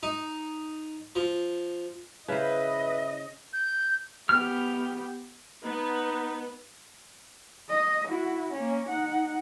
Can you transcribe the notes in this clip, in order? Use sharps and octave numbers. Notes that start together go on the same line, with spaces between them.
D#4
F3
C#3 E4 B4 C5 D#5
G6
B3 G4 F6
B3 D#4
D#5
E4 F#4
A#3 C#4
D#4 F#5